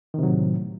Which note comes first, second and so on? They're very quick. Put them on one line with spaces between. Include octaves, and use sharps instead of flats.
D#3 C3 F#3 A2